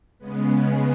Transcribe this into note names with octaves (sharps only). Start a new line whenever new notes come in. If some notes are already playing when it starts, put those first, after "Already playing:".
C#3 G#3 B3